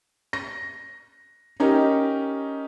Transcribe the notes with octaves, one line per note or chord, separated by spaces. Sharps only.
A#6
C#4 D#4 G4 A#4